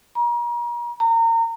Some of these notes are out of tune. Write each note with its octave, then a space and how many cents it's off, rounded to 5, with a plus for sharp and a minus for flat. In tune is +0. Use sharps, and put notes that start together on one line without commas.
A#5 +40
A#5 -30